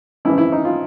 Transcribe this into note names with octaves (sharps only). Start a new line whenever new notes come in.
G#1 F#2 C#3 E3 E4
E4
D#4
F4